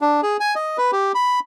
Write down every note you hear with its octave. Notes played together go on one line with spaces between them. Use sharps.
D4
G#4
G#5
D#5
B4
G4
B5